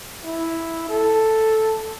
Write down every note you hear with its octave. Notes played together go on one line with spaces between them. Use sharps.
E4
A4